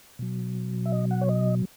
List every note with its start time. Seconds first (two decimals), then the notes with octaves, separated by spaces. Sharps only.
0.19 B2 F#3
0.86 E5
0.92 D#5
1.11 F#5
1.21 C#5
1.29 D#5